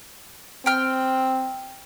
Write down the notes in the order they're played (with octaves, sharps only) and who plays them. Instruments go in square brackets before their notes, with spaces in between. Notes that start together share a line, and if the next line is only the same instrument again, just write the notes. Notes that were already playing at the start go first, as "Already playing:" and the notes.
[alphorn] C4 [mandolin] G5 F6